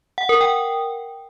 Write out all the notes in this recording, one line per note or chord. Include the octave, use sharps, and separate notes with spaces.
F#5
A#4
G5